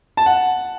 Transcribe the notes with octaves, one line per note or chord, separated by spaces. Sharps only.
A5
F#5